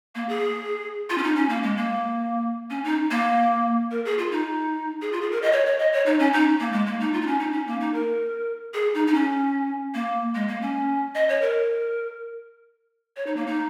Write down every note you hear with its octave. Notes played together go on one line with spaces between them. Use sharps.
A#3
G#4
F4
C#4
D#4
C#4
A#3
G#3
A#3
C#4
D#4
A#3
A#4
G#4
F4
D#4
G#4
F4
G#4
A#4
D#5
C#5
C#5
D#5
C#5
D#4
C#4
D#4
A#3
G#3
A#3
D#4
F4
D#4
C#4
D#4
C#4
A#3
D#4
A#4
G#4
D#4
D#4
C#4
A#3
G#3
A#3
C#4
D#5
C#5
A#4
C#5
D#4
A#3
D#4